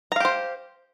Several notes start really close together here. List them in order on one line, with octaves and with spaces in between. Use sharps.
A#5 F5 G4 C5